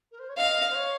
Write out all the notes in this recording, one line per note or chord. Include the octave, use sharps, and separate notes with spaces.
A#4
C5
C#5
D#5 F5
C5
C#5